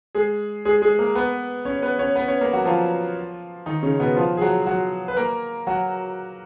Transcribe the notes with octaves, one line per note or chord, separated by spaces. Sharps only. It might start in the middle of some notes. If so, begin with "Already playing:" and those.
G#3 G#4
G#3 G#4
G#3 G#4
A#3 A#4
B3 B4
C#4 C#5
B3 B4
C#4 C#5
B3 B4
C#4 C#5
A#3 A#4
F#3 F#4
F3 F4
D#3 D#4
C#3 C#4
B2 B3
F3 F4
G#4
F#3 F#4
F#3 F#4
B4
A#3 A#4
F#3 F#4